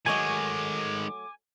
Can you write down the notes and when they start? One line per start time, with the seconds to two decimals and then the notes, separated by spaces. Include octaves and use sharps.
0.06 D#3 F#3 G#3 A3 D#5 G#5 D6